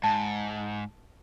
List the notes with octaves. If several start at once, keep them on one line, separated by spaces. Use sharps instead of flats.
G#2 A5